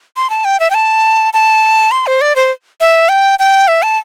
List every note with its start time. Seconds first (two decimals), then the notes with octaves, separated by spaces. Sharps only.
0.16 C6
0.30 A5
0.45 G5
0.60 E5
0.70 G5
0.74 A5
1.33 A5
1.91 C6
2.07 C5
2.21 D5
2.36 C5
2.81 E5
3.09 G5
3.39 G5
3.68 E5
3.83 A5